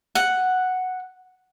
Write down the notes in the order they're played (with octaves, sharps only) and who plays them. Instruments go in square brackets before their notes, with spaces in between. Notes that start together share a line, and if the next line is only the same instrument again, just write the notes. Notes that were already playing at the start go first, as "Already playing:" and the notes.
[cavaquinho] F#5